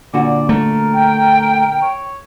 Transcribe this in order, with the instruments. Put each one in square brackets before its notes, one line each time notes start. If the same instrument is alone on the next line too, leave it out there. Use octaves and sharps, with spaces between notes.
[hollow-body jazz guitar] A#2 D3 F#4 [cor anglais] D5
[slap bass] A3 [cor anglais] A#4
[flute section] G5
[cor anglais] C#5